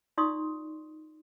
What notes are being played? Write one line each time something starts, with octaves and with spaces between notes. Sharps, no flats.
D#4 F4 D5 C6 C#6 D#6